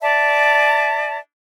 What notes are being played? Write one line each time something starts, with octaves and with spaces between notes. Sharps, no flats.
D5 E5 A5